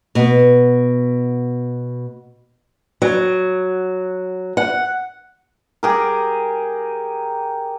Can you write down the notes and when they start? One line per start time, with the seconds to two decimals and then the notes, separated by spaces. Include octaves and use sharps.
0.15 B2 B3
3.02 F#3
4.57 F#5
5.83 G4 G#4 A#4